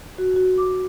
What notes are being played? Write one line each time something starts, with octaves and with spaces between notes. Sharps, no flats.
F#4
F#4
D6